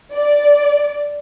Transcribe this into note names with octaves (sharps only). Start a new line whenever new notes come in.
D5